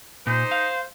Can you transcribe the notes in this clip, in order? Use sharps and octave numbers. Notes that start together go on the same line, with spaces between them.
A#2 D#4 C5
F5